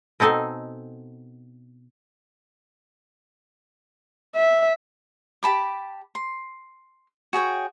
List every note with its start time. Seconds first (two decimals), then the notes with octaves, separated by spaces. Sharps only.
0.20 B2 C4 D#4 A4 G#5
4.35 E5
5.43 G4 A5 B5 D6
6.15 C6
7.33 F#4 G#4 C#5 G5